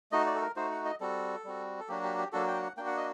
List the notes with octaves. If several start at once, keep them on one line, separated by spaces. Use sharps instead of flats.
A3 D#4 F#4 D#5
D5
A4
A#4
A3 D#4 F#4 C5
F#5
D#5
G3 C4 F#4 A4
G3 C4 F#4
A4
F#3 A#3 D4 F#4 G4
G4
G4
F#3 A#3 D4 F#4 A4
G5
F#5
A#3 D4 F#4 G5
F#5
D#5